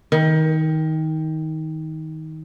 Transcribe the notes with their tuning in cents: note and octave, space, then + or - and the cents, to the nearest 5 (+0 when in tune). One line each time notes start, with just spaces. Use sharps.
D#3 +20